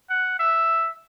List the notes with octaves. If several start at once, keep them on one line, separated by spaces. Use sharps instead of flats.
F#5
E5